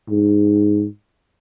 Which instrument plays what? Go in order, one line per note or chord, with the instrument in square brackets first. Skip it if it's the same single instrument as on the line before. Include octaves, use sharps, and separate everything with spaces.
[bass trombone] G#2